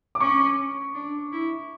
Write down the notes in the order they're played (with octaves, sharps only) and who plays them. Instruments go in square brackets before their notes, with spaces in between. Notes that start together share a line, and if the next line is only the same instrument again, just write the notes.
[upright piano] D6
[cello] C#4 [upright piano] C#6
[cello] D4
E4